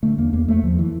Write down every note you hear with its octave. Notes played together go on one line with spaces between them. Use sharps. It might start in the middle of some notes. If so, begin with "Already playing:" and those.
D3 A3
E2 A#3
E2 A#3
E2 A3
E2 F3
E3